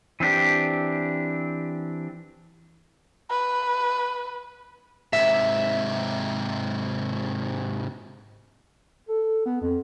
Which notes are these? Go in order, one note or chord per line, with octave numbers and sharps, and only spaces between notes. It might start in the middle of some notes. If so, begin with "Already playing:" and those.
E3 C4 D4 G4
B4
G#2 C3 E5
A4
B3
F2